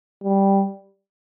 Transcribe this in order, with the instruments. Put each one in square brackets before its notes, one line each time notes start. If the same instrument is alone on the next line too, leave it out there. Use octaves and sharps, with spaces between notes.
[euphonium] G3